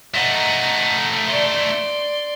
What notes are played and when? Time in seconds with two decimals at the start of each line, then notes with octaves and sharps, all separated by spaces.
0.14 A3 D#4 F#5 A#5
1.27 D5 C6